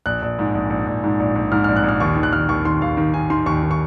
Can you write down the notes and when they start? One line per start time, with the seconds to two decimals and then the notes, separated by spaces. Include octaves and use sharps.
0.06 A#1 F#6
0.22 A#1
0.39 G#2
0.55 A#1
0.70 A#1
0.86 A#1
1.04 G#2
1.20 A#1
1.36 A#1
1.52 G#2 F6
1.64 A#1 F6
1.76 F#6
1.84 A#1 F6
2.00 D#2 C#6
2.16 D#3
2.23 F#6
2.33 D#2 F6
2.49 D#2 C#6
2.65 D#3 C6
2.82 D#2 F5
2.97 D#3
3.14 D#3 G#5
3.30 D#3 C6
3.46 D#2 C#6
3.63 D#3
3.71 C#6